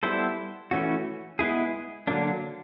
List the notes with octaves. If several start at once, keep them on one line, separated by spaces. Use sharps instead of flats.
G3 B3 E4 A4 C5
E3 A3 C#4 F#4
G#3 B3 E4 G#4
D3 F#3 A#3 D4